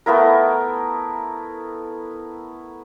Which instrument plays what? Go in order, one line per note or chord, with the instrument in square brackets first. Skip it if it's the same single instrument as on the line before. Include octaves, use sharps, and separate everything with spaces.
[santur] A3 B3 E4 A#4